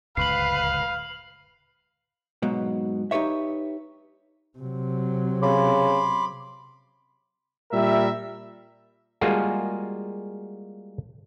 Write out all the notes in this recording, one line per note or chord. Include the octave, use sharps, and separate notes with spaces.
D1 C#2 F#2 B4 F5 C7 F#7
G#2 B2 F#3
D#4 G4 B4 C#5 E5
C3 F#3
C#3 B5 C6 D6
A#2 G3 A#4 E5
G3 G#3 A#3 F4 F#4 G#4